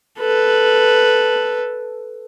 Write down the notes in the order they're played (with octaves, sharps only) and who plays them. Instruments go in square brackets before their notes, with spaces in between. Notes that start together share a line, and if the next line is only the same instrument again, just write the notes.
[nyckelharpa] A4 B4